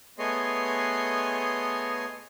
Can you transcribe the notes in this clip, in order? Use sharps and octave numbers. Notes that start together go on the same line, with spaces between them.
A3 B3 G#4 C#5 D#5 C6